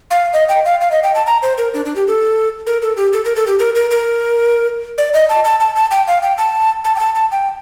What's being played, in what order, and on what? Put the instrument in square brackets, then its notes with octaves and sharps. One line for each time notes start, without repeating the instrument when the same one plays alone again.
[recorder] F5
D#5
G5
F5
F5
D#5
G5
A5
A#5
C5
A#4
D4
D4
G4
A4
A#4
A4
G4
A4
A#4
A4
G4
A#4
A#4
A#4
D5
D#5
A5
A5
A5
A5
G5
F5
G5
A5
A5
G5
A5
A5
G5